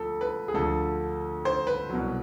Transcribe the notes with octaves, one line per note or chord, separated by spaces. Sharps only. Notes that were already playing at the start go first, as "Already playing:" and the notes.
Already playing: D2 F3 A4
B4
G#4
D2 D3 F3 A4
C5
B4
C2 B2 F#3